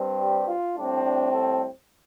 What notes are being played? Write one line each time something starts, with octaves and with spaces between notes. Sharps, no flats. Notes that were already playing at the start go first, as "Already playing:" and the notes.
Already playing: G2 G3 C4
G4
F4
A2 G3 C4 D4
D4
A4